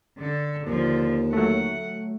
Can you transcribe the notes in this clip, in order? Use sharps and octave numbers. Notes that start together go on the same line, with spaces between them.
D3 A4
D#2 D3 F3
F#3 A3 F#5